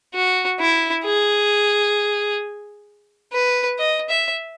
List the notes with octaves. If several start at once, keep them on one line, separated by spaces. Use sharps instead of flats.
F#4
E4
G#4
B4
D#5
E5